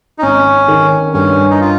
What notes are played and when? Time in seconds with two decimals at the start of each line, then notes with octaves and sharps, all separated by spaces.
0.18 D#4
0.22 G#1 C#4
0.68 D#3
1.14 G2 C#4
1.50 D#4
1.61 F4